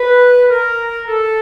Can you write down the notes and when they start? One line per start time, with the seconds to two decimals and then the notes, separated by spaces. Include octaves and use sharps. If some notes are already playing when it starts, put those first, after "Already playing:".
Already playing: B4
0.50 A#4
1.07 A4